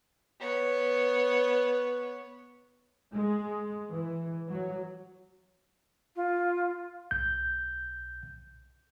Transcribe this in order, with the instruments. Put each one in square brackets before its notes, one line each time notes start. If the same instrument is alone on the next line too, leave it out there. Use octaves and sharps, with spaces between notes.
[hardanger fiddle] B3 C#5
[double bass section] G#3
E3
F#3
[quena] F4
[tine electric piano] B1 G6